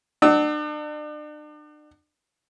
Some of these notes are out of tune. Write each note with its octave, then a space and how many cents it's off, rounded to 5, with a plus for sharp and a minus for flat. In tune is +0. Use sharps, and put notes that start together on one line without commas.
D4 +40 F#5 +30 E6 -25